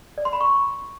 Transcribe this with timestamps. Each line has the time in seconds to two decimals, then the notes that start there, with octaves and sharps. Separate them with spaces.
0.18 D5
0.25 C6
0.33 B5
0.41 C#6